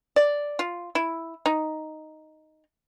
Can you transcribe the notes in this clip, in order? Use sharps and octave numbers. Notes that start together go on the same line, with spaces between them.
D5
F4
E4
D#4